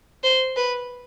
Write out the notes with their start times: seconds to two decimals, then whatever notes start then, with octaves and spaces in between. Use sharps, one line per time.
0.23 C5
0.56 B4